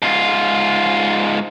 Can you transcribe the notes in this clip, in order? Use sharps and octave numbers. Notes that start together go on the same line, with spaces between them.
G#2 F4